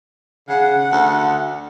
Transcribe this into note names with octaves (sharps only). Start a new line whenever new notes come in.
C#3 F#5
D2